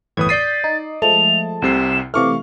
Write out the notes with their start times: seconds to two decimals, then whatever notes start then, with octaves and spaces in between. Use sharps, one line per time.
0.17 G1 E2 A2 B4 D#6 G#6
0.29 D5 G6 A6 B6 C7 D#7
0.64 D#4
1.02 F3 G#3 A3 A5 F7
1.62 C2 C3 C7 E7
2.14 C3 E3 A3 F5 C#6 D6 F6